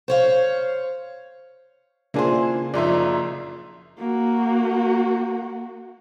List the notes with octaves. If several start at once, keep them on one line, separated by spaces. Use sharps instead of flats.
C5 C#5 F5
C#3 A#3 D4 E4 F4 G#4 C5
F#1 F#2 A#2 F3 D#4 D5 E5 C6
A#3 F#4